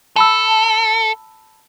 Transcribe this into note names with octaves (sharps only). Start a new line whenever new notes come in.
A4 A5 B5 E6